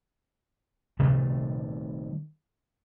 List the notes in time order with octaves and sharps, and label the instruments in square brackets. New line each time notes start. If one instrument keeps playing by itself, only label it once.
[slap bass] C3 D#3 G3 A3